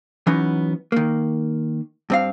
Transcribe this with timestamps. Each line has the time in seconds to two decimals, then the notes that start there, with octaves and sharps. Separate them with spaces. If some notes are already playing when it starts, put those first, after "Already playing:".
0.27 E3 F#3 B3 C#4 D#4
0.92 D#3 A#3
2.10 G2 C4 F5